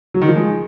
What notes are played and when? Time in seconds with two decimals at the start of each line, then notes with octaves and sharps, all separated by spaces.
0.14 F#3
0.21 D#3
0.29 F3
0.36 G#3